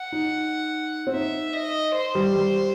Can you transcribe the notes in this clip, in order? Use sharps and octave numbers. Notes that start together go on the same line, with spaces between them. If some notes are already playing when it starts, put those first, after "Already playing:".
Already playing: F#5
D#4
C4
D#4 E5
D#5
C5
G3
G3